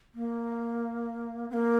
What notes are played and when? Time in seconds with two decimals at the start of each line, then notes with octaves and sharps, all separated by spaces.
0.15 A#3
1.50 C4
1.53 A#3